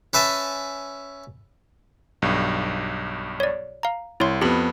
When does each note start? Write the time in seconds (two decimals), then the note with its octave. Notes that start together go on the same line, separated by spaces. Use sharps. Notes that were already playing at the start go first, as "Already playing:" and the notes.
0.13 C#4 B4 E5 G#5 A5
2.22 B1 G2
3.40 C#5 D5
3.83 F5 A#5
4.20 C2 E4 C#5 C6
4.41 F2 B3 G4 B5